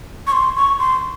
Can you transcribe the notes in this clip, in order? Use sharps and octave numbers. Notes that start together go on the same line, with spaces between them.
C#6
C6
C#6
C6